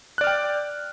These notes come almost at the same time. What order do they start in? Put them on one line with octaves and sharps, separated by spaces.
F#6 D5 F6 G5